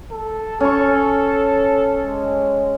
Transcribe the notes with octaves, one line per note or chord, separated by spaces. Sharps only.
A4
C#4 A4 C#6
G#3